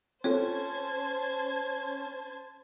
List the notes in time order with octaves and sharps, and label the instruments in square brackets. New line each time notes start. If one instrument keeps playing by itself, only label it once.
[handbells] C4 F4 A4 [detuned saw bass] C#4 [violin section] C5 A5 G#6 [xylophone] C#5